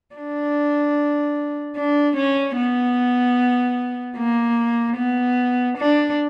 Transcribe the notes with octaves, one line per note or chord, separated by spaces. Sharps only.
D4
D4
C#4
B3
A#3
B3
D4